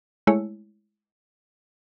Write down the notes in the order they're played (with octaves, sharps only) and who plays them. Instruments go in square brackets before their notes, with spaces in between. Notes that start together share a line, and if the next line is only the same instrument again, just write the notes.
[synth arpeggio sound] G#3 A3 E4 C#5